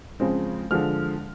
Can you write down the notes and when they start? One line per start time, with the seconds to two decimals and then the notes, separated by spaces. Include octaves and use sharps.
0.20 C#3 F3 G#3 C4
0.71 D3 F3 G#3 F6